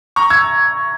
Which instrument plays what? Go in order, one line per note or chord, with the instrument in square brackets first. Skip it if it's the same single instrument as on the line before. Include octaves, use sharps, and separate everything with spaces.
[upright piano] A#5 C#6
E6 G#6